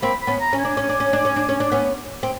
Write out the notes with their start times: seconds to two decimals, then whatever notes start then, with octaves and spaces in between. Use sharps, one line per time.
0.02 A#3 C4 B5
0.22 B5
0.27 B3 C#4
0.40 A#5
0.53 C#4
0.59 G#5
0.65 D4
0.77 C#4
0.89 D4
1.00 C#4
1.13 D4
1.25 C#4
1.36 D4
1.49 C#4
1.60 D4
1.72 B3 C#4
2.23 C4